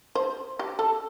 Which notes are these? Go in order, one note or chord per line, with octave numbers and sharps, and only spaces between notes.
C5
G4
A4